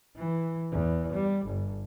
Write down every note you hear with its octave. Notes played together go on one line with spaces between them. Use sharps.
E3
E2
G3
G1